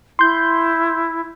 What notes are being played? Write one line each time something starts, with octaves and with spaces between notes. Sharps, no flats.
E4 C6 G6